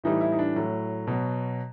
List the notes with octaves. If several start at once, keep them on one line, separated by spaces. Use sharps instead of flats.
A2 E3 G3 D#4
E4
D#4
D4
A2 F#3
B2 F#3